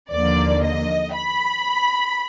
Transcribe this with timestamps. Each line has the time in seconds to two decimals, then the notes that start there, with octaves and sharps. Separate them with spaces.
0.11 D#2 D3 F3 A#3 D5
0.64 D#5
1.16 B5